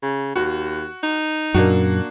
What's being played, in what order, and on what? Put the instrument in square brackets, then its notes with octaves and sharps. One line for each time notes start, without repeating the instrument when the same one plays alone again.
[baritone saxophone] C#3
[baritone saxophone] D#2 [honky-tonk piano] F#4
[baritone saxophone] D#4
[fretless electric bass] F#2 A#2 [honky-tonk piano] A#3 D4 F#4